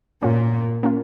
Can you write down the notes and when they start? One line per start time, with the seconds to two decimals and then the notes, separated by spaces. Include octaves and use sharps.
0.22 A#2 A#3 C#4 F4
0.83 A#3 C#4 F4